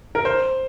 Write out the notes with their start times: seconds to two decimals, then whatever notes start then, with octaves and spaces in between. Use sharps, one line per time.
0.15 A#4
0.25 C5